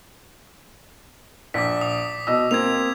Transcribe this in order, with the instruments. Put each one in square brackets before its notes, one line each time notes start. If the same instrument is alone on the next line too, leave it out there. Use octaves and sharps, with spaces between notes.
[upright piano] A#1 [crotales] D6 B6
[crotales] D#6
[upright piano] B2 D#5 E6
[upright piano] A#3 C4 [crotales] G#6 F7